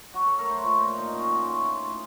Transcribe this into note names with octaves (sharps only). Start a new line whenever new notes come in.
F#3 F#4
A4
A3 A#4
C5
C#5
A#2 C5
C5
A#2
D#4
F#3 C#4
F4
A3
F#4
A2 F4
A2